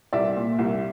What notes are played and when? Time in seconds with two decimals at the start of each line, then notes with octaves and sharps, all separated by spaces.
0.13 C2 D5 E5
0.36 A#2
0.59 C2